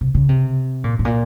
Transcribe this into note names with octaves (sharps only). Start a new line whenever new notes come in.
C3
C#3
C3
A#2
A2
A#2